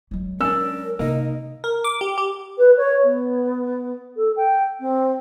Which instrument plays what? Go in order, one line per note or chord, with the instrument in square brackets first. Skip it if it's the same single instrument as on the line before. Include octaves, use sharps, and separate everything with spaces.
[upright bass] F#3 G#3
[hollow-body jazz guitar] C#4 D4 [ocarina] A#4 [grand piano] E6
[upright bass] C3 [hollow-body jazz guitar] A#3 D#4 A#4 [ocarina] D#5
[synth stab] A#4
D6
G4
G4
[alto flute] B4
C#5
B3
A4
G5
C4